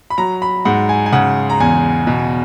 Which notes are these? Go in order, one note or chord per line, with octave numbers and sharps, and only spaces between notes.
B5
F#3 A#5
B5
G#2 F#5
G#5
G#5
C#3 F#5
A#5
E2 G#5
B2